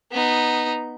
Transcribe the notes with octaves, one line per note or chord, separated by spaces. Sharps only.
B3 D#4